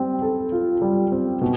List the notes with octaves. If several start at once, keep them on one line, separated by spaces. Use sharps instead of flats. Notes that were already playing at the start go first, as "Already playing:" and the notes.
Already playing: G3 C4
A4
F4
G3
C4
B2